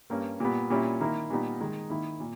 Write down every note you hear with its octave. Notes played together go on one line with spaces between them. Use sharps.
G2 G3 A#3 C#4
A#2 G3 B3
A#2 G3 C#4 E4
D#3 A#3 E4
A#2 G3 B3 D#4
D#3 G#3 D#4
D#3 A#3 E4
A#2